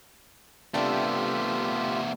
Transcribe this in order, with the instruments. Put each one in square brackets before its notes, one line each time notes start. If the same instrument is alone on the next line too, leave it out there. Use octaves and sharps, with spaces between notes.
[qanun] C3 C4 D4 [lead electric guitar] A3 B3 [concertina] F4 G4 E5